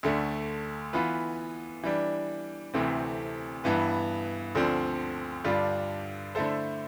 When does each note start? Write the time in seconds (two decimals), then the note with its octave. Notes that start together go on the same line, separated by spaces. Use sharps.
0.03 D2 D3 A3
0.93 E3 B3 F4 B4
1.83 E3 G3 D4
2.74 D2 C3 E3 A3 C4
3.64 G2 E3 B3 E4 B4
4.55 D2 D3 F3 C4
5.44 G2 D3 G3 D4 F4
6.35 D3 A3 E4 A4 C5